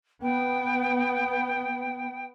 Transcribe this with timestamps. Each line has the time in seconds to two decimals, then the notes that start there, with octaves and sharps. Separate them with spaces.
0.22 B3 G5